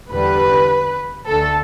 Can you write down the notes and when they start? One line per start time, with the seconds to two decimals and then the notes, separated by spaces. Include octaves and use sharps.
0.10 E2 D3 G3 B4
1.26 D2 D3 A3 A4